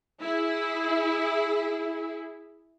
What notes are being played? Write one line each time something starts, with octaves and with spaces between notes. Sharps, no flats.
E4 G#4